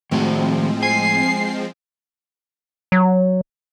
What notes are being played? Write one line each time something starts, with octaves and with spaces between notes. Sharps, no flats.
A2 D#3 F3 G#3 C4 F#4
G#5 C7
F#3